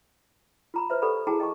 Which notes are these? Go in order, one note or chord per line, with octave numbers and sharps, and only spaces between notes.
F4 A#5 B5
B4 C5 E5
G4 A4 D5 F#5 B5
E4 F#4 G#4 G5 A5 A#5
D#5 G5 A5 C#6